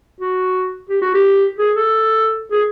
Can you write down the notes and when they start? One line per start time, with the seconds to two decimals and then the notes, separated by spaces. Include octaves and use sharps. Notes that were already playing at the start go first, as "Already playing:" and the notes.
0.21 F#4
0.89 G4
1.02 F#4
1.14 G4
1.59 G#4
1.76 A4
2.52 G#4